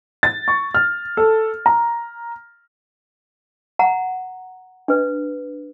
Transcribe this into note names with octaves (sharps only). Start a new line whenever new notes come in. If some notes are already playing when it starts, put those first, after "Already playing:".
A6
C#6
F6
A4
A#5
F#5 A#5
D4 B4